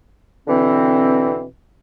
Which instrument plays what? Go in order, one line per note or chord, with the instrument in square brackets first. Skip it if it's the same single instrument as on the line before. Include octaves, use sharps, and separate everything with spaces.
[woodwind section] B2 D3 E3 C4